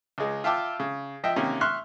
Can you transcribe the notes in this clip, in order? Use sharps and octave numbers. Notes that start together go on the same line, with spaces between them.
C#2 G#3
F4 E5 G5 A5 D6 E6
C#3
F3 D#5 E5 G5
C3 D#3 A#3 C#4
E5 C6 C#6 F6 F#6